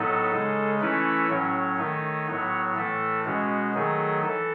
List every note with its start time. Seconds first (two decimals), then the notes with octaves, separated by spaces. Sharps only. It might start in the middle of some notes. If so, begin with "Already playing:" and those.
Already playing: A2 F#3 B3 D#4 A4
0.32 C#3 G#3 D#4
0.80 E3 A3 C#4 E4 B4
1.29 A2 F#3 C#4 C#5
1.78 D#3 A3 D#4
2.27 A2 F#3 B3
2.76 A2 E3 A3 A4
3.25 B2 G#3 C#4 F#4
3.74 D#3 F#3 A3 D#4 G#4
4.24 E3 A4